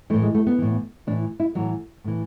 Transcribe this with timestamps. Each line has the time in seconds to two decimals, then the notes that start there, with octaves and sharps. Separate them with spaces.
0.10 E3 A3
0.14 A2
0.22 G#3
0.35 A3
0.47 B3
0.58 A2 E3
1.07 A2 E3 D4
1.40 E4
1.55 A2 E3 F#3
2.04 A2 E3